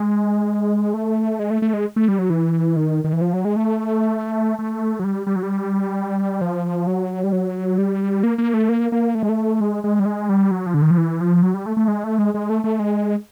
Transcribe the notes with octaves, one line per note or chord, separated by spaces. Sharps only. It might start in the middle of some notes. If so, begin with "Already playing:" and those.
Already playing: G#3
A3
G#3
A3
A3
G#3
A3
G3
F#3
E3
D#3
D#3
E3
F3
F#3
G#3
A3
A3
F#3
G3
G3
F#3
G3
F3
F#3
G3
F#3
G3
A#3
A#3
A3
A#3
A#3
A3
G#3
A3
G#3
G#3
G3
G#3
G3
F#3
F3
D3
D#3
F3
E3
F3
F#3
G3
A3
A3
G#3
A3
G#3
G#3
A3
A3
G#3